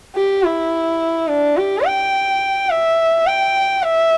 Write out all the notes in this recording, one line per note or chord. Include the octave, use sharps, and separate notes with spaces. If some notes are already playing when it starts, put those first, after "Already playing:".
G4
E4
D4
G4
G5
E5
G5
E5